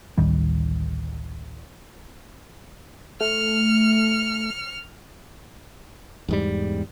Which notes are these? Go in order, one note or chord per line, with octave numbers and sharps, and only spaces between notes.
A1 D2 D#3 G3
A3 F6 C#7
E2 G#2 G3